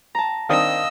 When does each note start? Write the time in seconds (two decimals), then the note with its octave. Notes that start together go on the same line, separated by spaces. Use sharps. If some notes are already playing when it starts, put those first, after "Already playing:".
0.15 A5 A#5
0.49 D#3 C4 D4 D#5 F5 D#6 E6